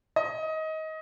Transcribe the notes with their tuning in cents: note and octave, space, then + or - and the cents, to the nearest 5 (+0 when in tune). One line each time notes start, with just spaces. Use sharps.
D#5 +20